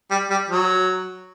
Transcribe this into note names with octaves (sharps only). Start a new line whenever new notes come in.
G3
G3
F#3